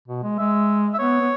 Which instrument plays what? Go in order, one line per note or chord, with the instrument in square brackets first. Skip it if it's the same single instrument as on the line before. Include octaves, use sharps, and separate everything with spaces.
[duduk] B2
G#3
[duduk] G#3 [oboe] E5
[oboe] E5
[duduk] B3 [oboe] C#5
[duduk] B3